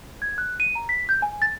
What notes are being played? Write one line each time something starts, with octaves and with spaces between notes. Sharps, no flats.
G#6
F#6
D#7
A#5
B6
G6
G#5
A6